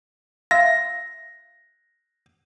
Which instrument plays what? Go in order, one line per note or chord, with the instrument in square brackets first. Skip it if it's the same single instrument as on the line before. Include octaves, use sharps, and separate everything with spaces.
[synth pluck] F4 E5 [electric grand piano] A#6